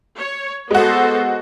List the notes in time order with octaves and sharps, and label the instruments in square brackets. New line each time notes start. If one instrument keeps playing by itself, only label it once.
[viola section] C#5
[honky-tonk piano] G#3 F#4 [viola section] B3 A4 C5